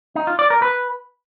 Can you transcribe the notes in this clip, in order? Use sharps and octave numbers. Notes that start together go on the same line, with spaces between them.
D#4
F4
D5
A#4
B4